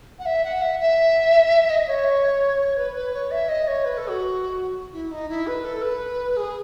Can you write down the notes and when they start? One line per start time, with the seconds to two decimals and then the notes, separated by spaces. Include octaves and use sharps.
0.19 F#5
0.26 E5
0.44 F#5
0.62 E5
0.80 E5
1.70 D#5
1.87 C#5
2.77 B4
2.95 B4
3.14 C#5
3.31 E5
3.49 D#5
3.68 C#5
3.85 B4
3.98 A4
4.09 F#4
4.93 E4
5.11 D#4
5.29 E4
5.47 B4
5.64 A4
5.82 B4
6.37 G#4